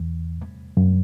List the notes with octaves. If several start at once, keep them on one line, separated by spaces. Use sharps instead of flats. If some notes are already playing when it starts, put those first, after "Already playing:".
Already playing: E2
F#2